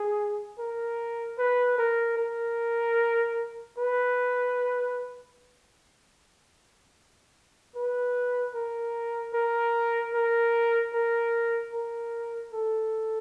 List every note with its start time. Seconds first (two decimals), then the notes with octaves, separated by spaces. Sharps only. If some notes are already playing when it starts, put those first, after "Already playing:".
Already playing: G#4
0.59 A#4
1.38 B4
1.78 A#4
2.18 A#4
3.78 B4
7.76 B4
8.55 A#4
9.34 A#4
10.14 A#4
10.93 A#4
11.73 A#4
12.53 A4